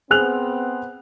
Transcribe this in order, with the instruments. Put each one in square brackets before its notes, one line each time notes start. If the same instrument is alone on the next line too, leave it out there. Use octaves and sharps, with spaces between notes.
[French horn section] B3 C4 [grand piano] G#4 F#6 F7